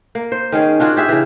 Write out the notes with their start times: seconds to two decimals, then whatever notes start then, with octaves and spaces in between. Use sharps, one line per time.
0.15 A#3
0.32 C5
0.52 D#3 C#4 G#4
0.80 D4 F4 F#4 G#4
0.97 G4 G#4 E5
1.09 C#3 E3